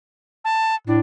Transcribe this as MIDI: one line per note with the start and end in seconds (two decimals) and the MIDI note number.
0.45 0.75 81
0.87 1.00 45
0.87 1.00 62